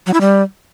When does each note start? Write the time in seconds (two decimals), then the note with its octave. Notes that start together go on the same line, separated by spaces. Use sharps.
0.07 F#3
0.14 E4
0.21 G3